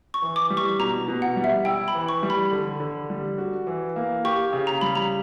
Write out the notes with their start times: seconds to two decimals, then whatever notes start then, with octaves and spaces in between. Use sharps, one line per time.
0.14 C#6
0.22 E3
0.36 D6
0.50 G3
0.57 C#6
0.79 B2 A#5
1.08 B2
1.22 F#5
1.36 G3
1.44 E5
1.65 E4 G5
1.88 B5
1.95 E3
2.09 C#6
2.23 G3
2.30 B5
2.52 D3
2.80 D3
3.10 G3
3.38 F#4
3.67 E3
3.96 A#3
4.25 G4 C#6
4.53 C#3
4.67 A#5
4.81 G3 B5
4.95 A#5